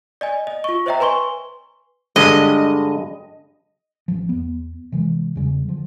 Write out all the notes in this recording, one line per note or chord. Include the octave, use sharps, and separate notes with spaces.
D5 D#5 G#5
D#5
F4 C#6
C5 C#5 D#5 E5 G5 A#5
B4 G#5 C6 C#6 G7
G2 D3 G#3 D#5
A1 F3
E2 B3
C3 E3 F3 G#3
E2 C#3 G3
D3 F3